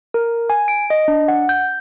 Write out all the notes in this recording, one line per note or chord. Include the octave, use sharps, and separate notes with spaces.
A#4
G#5
D7
D#5
D4
F#5
G6